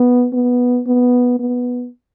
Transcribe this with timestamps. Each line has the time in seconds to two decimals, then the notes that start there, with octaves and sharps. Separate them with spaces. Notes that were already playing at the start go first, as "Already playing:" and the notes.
Already playing: B3
0.33 B3
0.87 B3
1.40 B3